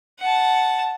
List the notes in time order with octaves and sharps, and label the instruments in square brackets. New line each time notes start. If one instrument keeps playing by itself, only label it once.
[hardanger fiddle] F#5 A5